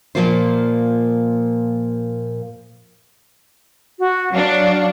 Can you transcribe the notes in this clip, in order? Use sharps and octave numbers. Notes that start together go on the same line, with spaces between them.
A#2 C#3 F3 A#3 F4 C5
F#4
F#3 D4 F5